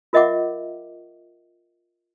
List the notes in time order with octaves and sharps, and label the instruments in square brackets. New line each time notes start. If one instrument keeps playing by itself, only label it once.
[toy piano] F4 A#4 D#5 E5 F#5 D6